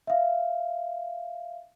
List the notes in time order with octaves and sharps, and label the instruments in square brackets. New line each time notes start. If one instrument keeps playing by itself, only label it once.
[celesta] E5 F5